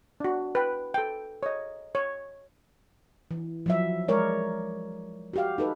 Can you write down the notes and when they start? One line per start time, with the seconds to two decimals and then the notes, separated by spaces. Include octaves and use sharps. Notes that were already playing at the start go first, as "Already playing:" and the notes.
0.20 D4 F#4
0.55 B4 G5
0.94 A4 G5
1.43 C#5 D#5
1.95 C#5
3.31 E3
3.66 F3 F#3 E5
4.08 G#3 A#4 C#5 D5
5.33 F#4 G4 F5
5.58 D#4 A4 B4